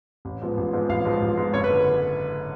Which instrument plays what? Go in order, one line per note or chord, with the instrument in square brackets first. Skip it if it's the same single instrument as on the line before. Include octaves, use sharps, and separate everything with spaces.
[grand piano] A1
G#2 F3 B3
A1
G#2 F3 B3
A1 F5
G#2 F3 B3
A1
G#2 F3 B3
F#1 C#5
B4
D3